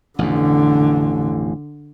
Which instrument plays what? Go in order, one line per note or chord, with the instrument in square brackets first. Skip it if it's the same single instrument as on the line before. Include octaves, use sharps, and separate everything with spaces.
[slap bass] A1 F2 B2 [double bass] D3